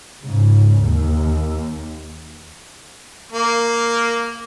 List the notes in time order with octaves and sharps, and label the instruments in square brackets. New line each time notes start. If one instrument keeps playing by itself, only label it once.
[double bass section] G#2 C#3
D#2
[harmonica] A#3